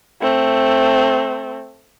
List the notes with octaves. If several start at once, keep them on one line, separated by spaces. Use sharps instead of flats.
A3 C4